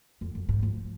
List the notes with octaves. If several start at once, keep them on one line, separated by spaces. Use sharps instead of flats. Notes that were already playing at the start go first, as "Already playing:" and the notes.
F2
F#2
G#2
F3